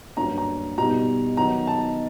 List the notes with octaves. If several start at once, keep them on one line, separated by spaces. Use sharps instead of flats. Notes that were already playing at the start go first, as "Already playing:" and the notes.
G2 D3 F#3 A#3 C#4 A#5
A#5
B2 G3 B3 D#4 A#5
D#3 F#3 B3 D#4 A#5
A5